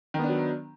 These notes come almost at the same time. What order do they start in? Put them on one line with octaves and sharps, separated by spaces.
D#3 B3 D4 F#3